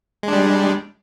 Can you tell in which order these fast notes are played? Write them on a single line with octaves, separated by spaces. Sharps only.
G#3 D4 G3